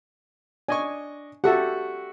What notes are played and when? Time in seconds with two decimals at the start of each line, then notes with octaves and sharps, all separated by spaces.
0.69 D4 D#5 G#5 C#6
1.44 F#4 G4 A4 E5 F#5